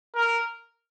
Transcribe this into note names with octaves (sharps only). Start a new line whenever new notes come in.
A#4